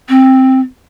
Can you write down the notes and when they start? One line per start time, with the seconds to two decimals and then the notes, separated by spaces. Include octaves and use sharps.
0.09 C4